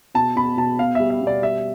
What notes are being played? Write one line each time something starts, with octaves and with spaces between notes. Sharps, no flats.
B2 A5
B2 B5
B2 A5
B2 F5
G3 E5
E5
B2
D5
G3 E5